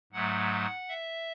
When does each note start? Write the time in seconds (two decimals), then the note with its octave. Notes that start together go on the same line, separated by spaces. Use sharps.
0.13 G#2 F#3 A3 F#5
0.89 E5